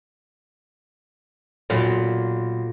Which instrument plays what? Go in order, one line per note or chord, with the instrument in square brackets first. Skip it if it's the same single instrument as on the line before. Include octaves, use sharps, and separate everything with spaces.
[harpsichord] B1 [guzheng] A#2